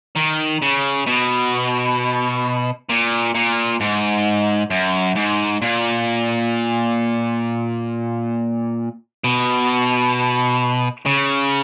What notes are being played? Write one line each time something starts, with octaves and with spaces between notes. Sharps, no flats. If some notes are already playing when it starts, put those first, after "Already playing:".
D#3
C#3
B2
A#2
A#2
G#2
F#2
G#2
A#2
B2
C#3